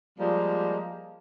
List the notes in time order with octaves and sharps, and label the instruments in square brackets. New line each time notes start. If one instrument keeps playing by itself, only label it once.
[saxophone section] F3 G3 G#3 A#3